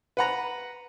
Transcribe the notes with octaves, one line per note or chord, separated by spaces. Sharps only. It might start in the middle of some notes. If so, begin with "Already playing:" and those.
B4 F#5 A#5